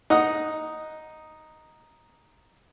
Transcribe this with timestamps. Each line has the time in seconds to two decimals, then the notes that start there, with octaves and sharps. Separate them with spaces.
0.10 D#4 F#5 D#6